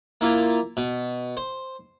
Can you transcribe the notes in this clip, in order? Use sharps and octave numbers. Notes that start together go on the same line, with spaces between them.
A#3 E4 F4
B2
C5